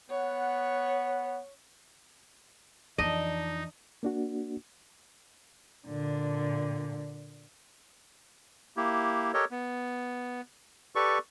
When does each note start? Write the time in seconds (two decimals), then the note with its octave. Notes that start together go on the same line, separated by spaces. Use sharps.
0.10 B3 C#5 F#5
2.98 F2 E3 D4 D#4 D#5
4.03 A#3 D4 F#4
5.88 A#2 D3
8.77 A#3 E4 G4
9.33 G4 A4 A#4 C#5 D#5
9.51 B3
10.95 G4 A4 B4 D5 C#6